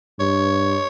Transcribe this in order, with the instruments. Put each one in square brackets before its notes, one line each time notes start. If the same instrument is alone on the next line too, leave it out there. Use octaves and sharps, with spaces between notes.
[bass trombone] G2 [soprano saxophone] C#5